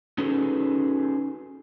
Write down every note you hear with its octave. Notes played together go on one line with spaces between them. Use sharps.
C#4 D#4 F#4 G#4 A4 B4